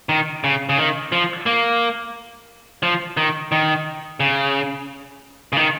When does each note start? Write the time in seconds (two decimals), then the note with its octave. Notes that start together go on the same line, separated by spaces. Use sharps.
0.09 D#3
0.44 C#3
0.69 C#3
0.78 D#3
1.12 F3
1.46 A#3
2.83 F3
3.17 D#3
3.52 D#3
4.20 C#3
5.53 C#3
5.57 D#3